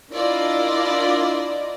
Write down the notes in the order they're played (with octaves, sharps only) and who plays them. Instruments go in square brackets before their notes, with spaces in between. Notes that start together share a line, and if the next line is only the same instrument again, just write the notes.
[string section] D4 E4 F4 A#4 D5 D#5